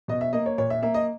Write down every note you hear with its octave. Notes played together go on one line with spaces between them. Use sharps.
B2 D#5
E5
A#3 D#5
C#5
A#2 C#5
E5
A#3 E5
D#5